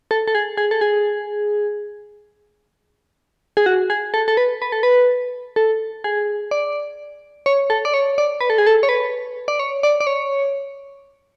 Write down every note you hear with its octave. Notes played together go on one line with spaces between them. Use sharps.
A4
A4
G#4
G#4
A4
G#4
G#4
F#4
G#4
A4
A4
B4
B4
A4
B4
A4
G#4
D5
C#5
A4
D5
C#5
D5
B4
A4
G#4
A4
C#5
B4
D5
C#5
D5
D5
C#5